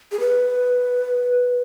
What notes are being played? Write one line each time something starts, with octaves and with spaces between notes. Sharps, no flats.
G#4
B4